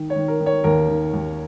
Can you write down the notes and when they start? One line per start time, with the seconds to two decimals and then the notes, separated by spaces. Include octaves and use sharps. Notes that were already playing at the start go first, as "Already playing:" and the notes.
Already playing: D#3
0.10 C#5
0.16 D#3
0.28 A#4
0.40 D#3
0.46 C#5
0.64 D#2 A#4
0.88 D#3
1.13 D#2